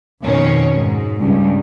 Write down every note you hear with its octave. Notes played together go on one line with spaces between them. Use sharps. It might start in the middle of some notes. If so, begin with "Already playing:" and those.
F2 B2 D#3 C#4
G#2
C#2 G2